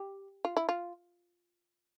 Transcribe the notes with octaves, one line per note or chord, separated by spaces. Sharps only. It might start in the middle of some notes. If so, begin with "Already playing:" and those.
Already playing: G4
F4
E4
F4